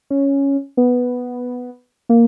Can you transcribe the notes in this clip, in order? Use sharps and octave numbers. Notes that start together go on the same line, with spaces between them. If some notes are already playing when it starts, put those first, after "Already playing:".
C#4
B3
A#3